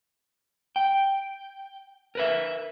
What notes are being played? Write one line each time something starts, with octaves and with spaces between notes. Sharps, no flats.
G5
A#4 B4 E5